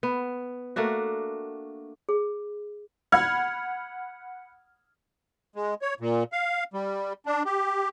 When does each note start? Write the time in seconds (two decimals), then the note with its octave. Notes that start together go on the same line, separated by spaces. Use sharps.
0.03 B3
0.76 A3 A#3 D4 F#4
2.09 G#4
3.12 F#5 B5 F6 G#6
5.56 G#3
5.82 C#5
6.00 A#2
6.32 F5
6.74 G3
7.26 D4
7.46 G4